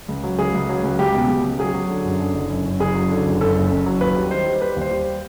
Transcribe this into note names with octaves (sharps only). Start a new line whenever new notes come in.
C#2
F#3
C#2 G#4
C#2
F#3
C#2
C#2 G4
B2
C#2
C#2
F#3 G#4
F#3
D3
F#2
D3
F#1
F#2
F#2
F#1 G#4
F#3
D3
F#1
F#2 A4
F#1
F#1
F#3
D#2 B4
G3
D#3 C5
G3
G3 B4
D#2 C5
G3